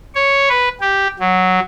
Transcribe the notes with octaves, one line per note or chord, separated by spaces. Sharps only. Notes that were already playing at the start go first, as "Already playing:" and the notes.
C#5
B4
G4
F#3